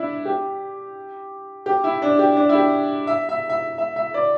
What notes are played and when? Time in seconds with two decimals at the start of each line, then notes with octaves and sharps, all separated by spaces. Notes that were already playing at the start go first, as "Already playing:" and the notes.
Already playing: D4 E4
0.25 G4
1.66 G4
1.84 E4
2.02 D4
2.19 G4
2.37 D4
2.49 E4
2.55 G4
3.07 E5
3.29 E5
3.49 E5
3.78 E5
3.96 E5
4.14 D5